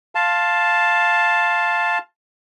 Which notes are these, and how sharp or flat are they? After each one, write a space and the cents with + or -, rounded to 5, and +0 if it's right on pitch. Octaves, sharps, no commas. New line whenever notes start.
F5 +0 A5 +0 C6 +15